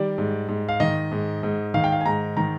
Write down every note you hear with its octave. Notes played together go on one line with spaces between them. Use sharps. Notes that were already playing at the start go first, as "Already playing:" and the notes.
Already playing: D#3 G3 D5
G#2
G#2
F5
D#3 D#5
G#2
G#2
D#3 F5
G5
F5
G#5
G#2 A#5
D#3 A#5